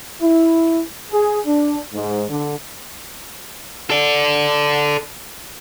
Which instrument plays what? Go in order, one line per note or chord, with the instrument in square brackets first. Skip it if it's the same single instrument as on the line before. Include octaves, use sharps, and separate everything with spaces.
[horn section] E4
G#4
D4
G#2
D3
[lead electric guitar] A4 D5